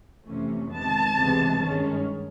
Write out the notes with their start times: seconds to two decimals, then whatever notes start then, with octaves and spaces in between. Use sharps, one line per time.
0.26 F2 C3 E3 A3 C#4
0.70 C3 D#3 G#3 B3 A5
1.14 C#2 C3 E3 G#3 B3
1.58 G2 D#3 G#3 C#4